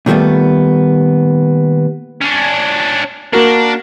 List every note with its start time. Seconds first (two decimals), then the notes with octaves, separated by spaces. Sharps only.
0.06 A#2 D#3 G3 A3 B3
2.21 C#4 D4
3.33 A#3 D4 F#4 A#4